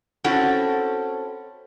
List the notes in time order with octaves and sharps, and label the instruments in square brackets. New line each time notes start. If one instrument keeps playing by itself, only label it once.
[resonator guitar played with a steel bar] C4 C#4 E4 F#4 A4